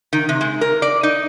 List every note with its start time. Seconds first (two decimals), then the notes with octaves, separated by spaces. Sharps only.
0.13 D#3
0.29 C3
0.41 G#3
0.61 A#4
0.82 D5
1.03 D#4